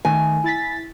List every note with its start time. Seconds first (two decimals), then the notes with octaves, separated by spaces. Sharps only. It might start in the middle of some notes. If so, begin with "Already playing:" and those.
0.05 D#3 A3 G#5
0.44 E4 A6 B6